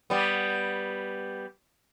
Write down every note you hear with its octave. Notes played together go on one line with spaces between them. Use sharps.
G3 B3